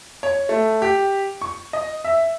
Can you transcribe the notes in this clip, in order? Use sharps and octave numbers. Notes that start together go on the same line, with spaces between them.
C#5
A3
G4
C#6
D#5
E5